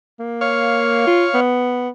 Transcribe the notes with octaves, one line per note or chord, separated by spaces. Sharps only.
A#3
C#5 F5
F4
B3